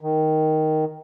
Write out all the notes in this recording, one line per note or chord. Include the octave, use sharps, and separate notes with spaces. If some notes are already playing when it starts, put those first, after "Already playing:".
D#3